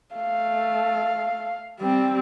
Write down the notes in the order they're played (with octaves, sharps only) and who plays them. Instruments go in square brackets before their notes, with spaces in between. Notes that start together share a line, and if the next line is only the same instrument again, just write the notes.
[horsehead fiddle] A3 [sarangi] F5
[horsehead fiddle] G3 C4